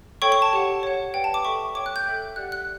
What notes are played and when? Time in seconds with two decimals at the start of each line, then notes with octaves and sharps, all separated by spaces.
0.22 A4 C#5 G5 C#6
0.32 C#6
0.42 A5
0.53 G4 C#5 F#5
0.83 C#5 F#5
1.14 B4 D5 F#5 G5
1.24 A5
1.34 D6
1.45 A4 E5 G5 C#6
1.75 C#5 G5 D6
1.86 F#6
1.96 G6
2.06 A4 E5 G5
2.36 G4 D5 F#5 F#6
2.52 F#6